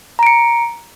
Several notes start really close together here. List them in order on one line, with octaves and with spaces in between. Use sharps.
A#5 D7 C#7